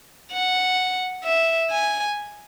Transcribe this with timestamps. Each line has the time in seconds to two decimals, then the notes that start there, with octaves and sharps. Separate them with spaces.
0.32 F#5
1.24 E5
1.71 G#5